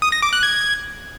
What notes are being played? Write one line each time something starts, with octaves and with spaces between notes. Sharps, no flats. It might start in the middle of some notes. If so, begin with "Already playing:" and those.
D#6
A#6
D6
F#6
G#6